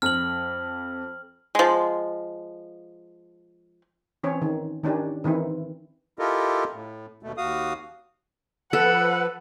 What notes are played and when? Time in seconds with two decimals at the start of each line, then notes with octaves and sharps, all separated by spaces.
0.02 F2 F6 F#7
1.55 F3 G#3
4.23 E3 C4 C#4 C#5
4.42 D#3
4.84 D#3 C#4 D4 G4
5.24 D#3 E3 C4 E4
6.19 E4 F4 G4 A4 A#4 D#5
6.73 A2
7.23 D#2 B2 A3
7.37 D#2 F#4 F5 D#6
8.73 F3 A4 B4 F#5